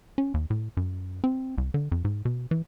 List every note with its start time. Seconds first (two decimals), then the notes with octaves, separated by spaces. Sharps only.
0.18 C#4
0.34 D#2
0.50 A2
0.77 F#2
1.24 C4
1.58 C2
1.74 D3
1.92 F2
2.05 G#2
2.25 B2
2.51 E3